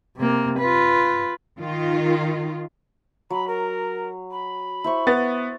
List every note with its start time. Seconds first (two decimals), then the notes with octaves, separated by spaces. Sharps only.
0.17 C3 A#3
0.59 F4 B4
1.59 D#3 F4
3.30 F#3 B5
3.47 A#4
4.31 B5
4.84 E4 C5 C#6
5.07 B3 A6